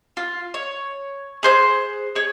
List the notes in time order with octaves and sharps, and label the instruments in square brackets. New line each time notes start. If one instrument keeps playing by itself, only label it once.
[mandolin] F4
C#5
G#4 C5 F#6
G#4 C#5